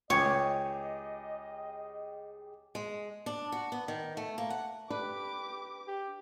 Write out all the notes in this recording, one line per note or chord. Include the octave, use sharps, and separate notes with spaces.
C#2 G4 G#4 C#5 D#5
G#3
D4
F#4
B3
D#3
A3
A#3
F#5
D4 G4 B4 D6
G4